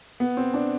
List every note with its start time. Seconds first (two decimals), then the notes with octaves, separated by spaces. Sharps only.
0.20 B3
0.37 C4
0.54 D4